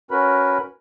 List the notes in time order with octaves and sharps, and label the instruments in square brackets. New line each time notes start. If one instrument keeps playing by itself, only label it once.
[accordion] C#4 F#4 A#4 B4 B5